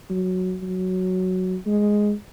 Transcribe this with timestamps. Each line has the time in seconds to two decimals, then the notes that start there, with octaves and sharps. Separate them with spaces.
0.10 F#3
0.62 F#3
1.66 G#3